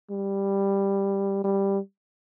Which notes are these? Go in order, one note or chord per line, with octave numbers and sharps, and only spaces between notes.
G3
G3